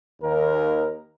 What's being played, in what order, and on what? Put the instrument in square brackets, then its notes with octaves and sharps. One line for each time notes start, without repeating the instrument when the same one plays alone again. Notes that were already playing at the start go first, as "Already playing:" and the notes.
[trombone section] D#2 A#4